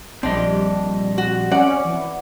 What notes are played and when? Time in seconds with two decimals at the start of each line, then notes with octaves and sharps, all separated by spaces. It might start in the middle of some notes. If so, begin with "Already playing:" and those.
0.23 A#1 G3 C4 D4 D#5
1.18 F#4
1.51 C#4 D5 F#5
1.85 E3